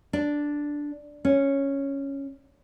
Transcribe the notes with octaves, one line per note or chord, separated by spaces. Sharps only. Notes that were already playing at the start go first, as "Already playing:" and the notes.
D4
C#4